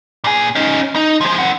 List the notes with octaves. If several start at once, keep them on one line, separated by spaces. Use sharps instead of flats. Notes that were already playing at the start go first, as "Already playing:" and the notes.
A#2 G#4
C#4 D#4
D#4
F3 G#3
C4 F#5